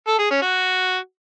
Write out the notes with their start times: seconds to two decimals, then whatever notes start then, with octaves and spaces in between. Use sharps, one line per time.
0.08 A4
0.19 G#4
0.30 C#4
0.42 F#4